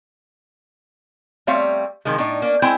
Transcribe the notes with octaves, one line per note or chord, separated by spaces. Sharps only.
G3 A3 C4 C#5 E5 F5
C3 D#3 F3 G#3
A2 D4 D#4
A#3 C#4 D4
G#3 C4 E4 C5 G#5